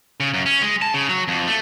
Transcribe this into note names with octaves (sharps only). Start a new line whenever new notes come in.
C#3
F#2
C#4
G#3
A5
C#3
F#3
F2
A3